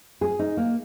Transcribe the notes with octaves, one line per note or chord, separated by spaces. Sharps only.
G#4
D#4
A#3